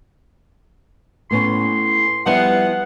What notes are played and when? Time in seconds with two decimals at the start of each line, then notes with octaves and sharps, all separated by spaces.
1.31 A2 B3 C#4 C6
2.26 F3 G3 B3 E4 F#5